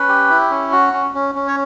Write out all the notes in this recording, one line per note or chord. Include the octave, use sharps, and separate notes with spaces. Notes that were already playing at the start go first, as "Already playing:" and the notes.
Already playing: C#4 B4
G4
E4
C#4
F#4
C#4
C#4
C#4
C#5